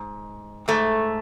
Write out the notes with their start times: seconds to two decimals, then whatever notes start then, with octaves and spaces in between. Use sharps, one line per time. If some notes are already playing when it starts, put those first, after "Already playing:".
Already playing: G#2
0.68 G#2 A3